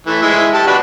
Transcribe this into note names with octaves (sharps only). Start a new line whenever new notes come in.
E3 A3
G#3 E4 E5
G4 A5
D4 F#4 B4